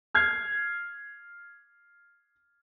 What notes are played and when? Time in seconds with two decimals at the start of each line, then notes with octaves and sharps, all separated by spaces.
0.15 F6 G#6 C7